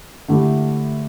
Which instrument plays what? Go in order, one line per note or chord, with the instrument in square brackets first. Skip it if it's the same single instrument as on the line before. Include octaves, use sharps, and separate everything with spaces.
[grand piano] D3 A3 E4 G4